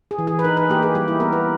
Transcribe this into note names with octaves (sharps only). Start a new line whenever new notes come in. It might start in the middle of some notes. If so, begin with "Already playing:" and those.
G#4
E3
G#4
B4
D#4 A#4
B4
A#3 G4
G#4
G3 G4
E4
B3 A#4
B4